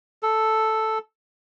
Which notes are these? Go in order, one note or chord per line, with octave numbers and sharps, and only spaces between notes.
A4